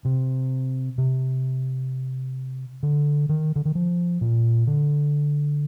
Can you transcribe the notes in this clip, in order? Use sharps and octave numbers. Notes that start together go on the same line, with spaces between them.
C3
C3
D3
D#3
D3
D#3
F3
A#2
D3